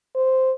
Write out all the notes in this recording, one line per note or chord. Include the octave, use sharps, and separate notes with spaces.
C5